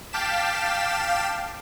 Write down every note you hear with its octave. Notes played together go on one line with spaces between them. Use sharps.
F5 G5 A5 D6 B6 E7